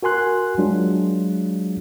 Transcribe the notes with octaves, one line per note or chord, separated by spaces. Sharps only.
F#4 A#4 G#5 C6 F#6
F#3 G#3 D4 F4